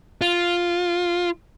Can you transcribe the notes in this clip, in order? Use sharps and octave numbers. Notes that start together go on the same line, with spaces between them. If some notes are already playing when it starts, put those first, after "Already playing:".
F4